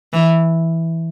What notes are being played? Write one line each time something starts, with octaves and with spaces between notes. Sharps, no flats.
E3